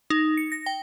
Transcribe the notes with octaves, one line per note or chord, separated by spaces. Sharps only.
D#4
C#7
A#6
G5